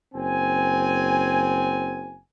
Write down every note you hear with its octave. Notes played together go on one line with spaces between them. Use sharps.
F#1 C4 G#5